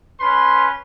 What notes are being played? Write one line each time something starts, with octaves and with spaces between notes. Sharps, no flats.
C#4 B4 C6